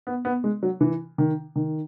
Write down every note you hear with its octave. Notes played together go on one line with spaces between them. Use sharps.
B3
B3
G#3
F#3
E3
D#3
D#3